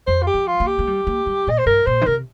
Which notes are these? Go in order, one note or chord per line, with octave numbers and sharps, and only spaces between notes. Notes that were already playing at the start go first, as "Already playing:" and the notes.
F2 C5
F4
G4
F3
F4
A#3
G4
A#3
G3
A#3
G3
A#2 D#5
C5
G2 A#4
A#2 C5
D#3
C3 A#4